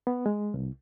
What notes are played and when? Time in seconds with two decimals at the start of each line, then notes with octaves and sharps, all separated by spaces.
0.07 B3
0.26 G#3
0.54 C2